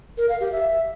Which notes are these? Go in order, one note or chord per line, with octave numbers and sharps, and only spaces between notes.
A#4
F5
G4
E5